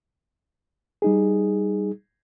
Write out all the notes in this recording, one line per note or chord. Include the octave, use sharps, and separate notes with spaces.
G3 D#4 G#4